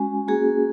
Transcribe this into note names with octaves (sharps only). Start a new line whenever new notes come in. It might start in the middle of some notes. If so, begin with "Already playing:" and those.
Already playing: G#3 C#4 F#4 G#5
A#3 C#4 F#4 G#4